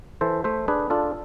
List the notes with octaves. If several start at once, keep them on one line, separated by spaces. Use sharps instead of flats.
E3 A4 C5
A3 C5 E5
D4 G#4 B4
D4 F4 A4